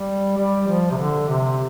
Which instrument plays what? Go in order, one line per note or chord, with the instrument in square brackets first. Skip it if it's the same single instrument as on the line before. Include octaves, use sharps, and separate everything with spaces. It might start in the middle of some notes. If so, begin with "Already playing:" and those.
Already playing: [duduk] G3
G3
F3
C3
D3
C3